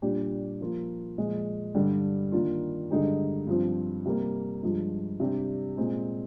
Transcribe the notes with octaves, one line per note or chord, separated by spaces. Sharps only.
A#2 G3 D4 G4
F3 A#3 F4
A#2 F3 G#3
G2 D3 G3 D4 G4
D#3 A#3 D4 F4
G2 D3 G#3 D#4 G4
G2 F3 C4
C3 G3 A#3
G2 F3 G#3
C3 G3 D4 G4
A#2 G#3 C4